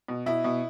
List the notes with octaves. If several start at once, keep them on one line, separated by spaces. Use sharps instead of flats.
B2
B2 E4
B2